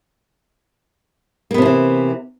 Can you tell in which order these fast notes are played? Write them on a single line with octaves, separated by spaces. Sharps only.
A#3 B3 C3 F3 E3